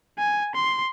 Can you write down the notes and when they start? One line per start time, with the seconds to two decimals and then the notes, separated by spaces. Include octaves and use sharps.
0.19 G#5
0.55 C6